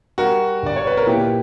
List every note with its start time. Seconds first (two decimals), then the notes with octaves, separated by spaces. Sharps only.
0.18 G3 F#4 A#4
0.63 G1 D5
0.76 C#5
0.87 B4
0.97 A#4
1.07 A#2 E4 G4